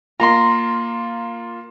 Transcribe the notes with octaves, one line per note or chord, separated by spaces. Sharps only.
A#3 F4 A#5 C6